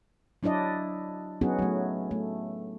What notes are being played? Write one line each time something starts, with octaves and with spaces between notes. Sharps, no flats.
F#3 D4 E4 D5 D#5
F#3 B3 C#4 D#4 F#4 G#4
F#3 A3
A3